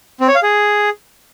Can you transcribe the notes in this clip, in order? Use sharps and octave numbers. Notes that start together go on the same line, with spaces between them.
C4
C#5
F5
G#4